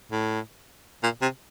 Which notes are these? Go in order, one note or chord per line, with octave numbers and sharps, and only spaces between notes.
A2
A#2
C3